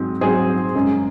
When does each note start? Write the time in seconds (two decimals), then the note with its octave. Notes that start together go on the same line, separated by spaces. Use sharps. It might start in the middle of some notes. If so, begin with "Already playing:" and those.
Already playing: G#2 F#3 C4
0.21 G#2 F#3 C4 G#4 C5
0.75 F#2 C#3 G#3